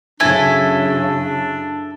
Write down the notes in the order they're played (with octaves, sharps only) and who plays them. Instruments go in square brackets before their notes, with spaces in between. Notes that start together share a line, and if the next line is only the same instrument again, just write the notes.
[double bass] F#2 C#3 [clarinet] D4 [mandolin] E4 A4 G#5